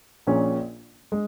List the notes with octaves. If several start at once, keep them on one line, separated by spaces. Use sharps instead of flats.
A#1 A#2 A#3 C#4 G#4
G#3